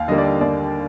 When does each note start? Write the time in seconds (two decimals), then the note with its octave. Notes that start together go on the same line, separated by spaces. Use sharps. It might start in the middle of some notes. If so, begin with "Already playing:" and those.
Already playing: D#2 F5
0.08 D3 G3 A#3 D#5
0.18 D5
0.25 D#5
0.41 D#2 D5